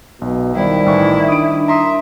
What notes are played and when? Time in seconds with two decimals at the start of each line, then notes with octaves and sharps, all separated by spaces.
0.21 B1 B2
0.56 D#3 G3 E4 C5 D5
0.86 A1 E3 C#6
1.28 D4 D#6 D7
1.68 E5 A#5 C6 D#6